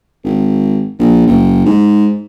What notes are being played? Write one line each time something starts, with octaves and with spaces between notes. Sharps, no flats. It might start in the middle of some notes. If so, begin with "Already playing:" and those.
G#1
A#1
F#1
G#2